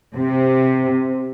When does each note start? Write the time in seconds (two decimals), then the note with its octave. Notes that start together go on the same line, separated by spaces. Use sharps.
0.17 C3